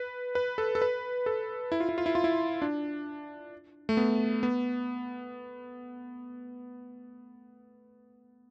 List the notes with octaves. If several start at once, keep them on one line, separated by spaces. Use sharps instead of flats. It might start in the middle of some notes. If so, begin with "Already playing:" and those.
Already playing: B4
B4
A4
A4
B4
A4
E4
F4
E4
F4
E4
F4
E4
D4
A3
B3
B3